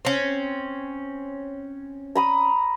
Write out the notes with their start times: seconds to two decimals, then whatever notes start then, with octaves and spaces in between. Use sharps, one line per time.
0.05 C4 C#4
2.15 A#5 B5 D#6